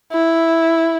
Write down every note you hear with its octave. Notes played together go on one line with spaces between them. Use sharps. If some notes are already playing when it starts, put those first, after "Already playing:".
E4